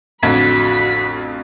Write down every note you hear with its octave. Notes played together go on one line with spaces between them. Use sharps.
A1 F2 D3 F#4 B5 B6